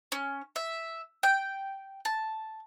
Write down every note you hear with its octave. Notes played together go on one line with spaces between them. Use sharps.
C#4
E5
G5
A5